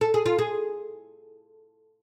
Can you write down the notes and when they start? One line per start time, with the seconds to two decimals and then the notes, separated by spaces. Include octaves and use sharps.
0.01 A4
0.14 G#4
0.26 F4
0.39 G#4